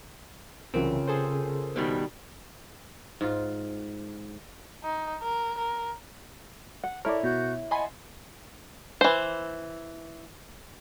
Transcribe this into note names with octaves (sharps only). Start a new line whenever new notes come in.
C2 C#3 E3 F#3 C4 C#4 F4 A#4
G#4 A4 C5
B2 D#3 G3
G#2 F4
D#4
A#4
A#4
F#5
E4 A4 A#4 C#5 D5
B2 F#4 G6
D#5 F#5 G#5 A5 B5 C6
E3 C5